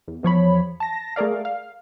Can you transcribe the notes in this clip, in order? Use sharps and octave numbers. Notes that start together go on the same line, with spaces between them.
E2
E2 F3 C#5 B5
A5 A#6
A3 G#4 A#4 D5 F5
F5